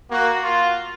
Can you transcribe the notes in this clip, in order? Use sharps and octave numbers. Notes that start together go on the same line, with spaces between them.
A#3 F#4
F4